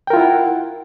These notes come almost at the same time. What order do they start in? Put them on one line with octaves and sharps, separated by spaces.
G5 A#4 F4 E4 F#5